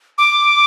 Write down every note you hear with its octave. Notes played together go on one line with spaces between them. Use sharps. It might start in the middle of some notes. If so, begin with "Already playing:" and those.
D6